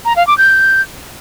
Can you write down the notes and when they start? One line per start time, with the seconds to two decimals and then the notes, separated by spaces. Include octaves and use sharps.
0.05 A#5
0.16 F5
0.27 D6
0.38 G6